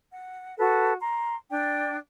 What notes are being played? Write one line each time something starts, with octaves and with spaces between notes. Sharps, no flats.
F#5
F#4 A4 B4
A#5 C6
D4 D5 G5